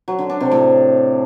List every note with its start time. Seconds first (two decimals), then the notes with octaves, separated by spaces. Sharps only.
0.08 F#3
0.19 D3
0.30 D4
0.41 C3
0.52 A2